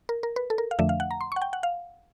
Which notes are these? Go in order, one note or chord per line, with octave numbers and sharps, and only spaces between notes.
A#4
A#4
B4
A4
A#4
F5
F2 D3 F3 A3 D4 E5
F5
F#5
A#5
C6
F#5 C#6
G5
F#5
F5